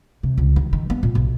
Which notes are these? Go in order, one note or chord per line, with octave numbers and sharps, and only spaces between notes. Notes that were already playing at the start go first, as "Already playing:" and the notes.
C3
C#2
D#3
D#3
B3
A#2
B1